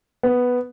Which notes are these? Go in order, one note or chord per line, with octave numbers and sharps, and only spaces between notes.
B3